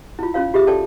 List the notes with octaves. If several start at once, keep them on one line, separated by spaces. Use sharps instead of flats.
E4 F4
C#4 F4 C#5 F5
F4 G4 G#4 E5 D#6
A4 C#5 D5 G5 A5